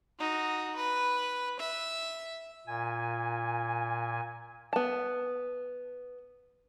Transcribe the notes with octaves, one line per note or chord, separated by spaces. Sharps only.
D#4 F#4
B4
E5
A#2 G#5
B3 A5